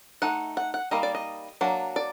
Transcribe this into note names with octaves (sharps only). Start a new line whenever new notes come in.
A3 D#4 F#5
F#5
F#5
G3 A#3 D#4 D#5
D5
D#5
F#3 A#3 D4
D5